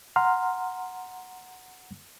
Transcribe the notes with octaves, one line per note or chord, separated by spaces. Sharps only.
F#5 A#5 C6 F6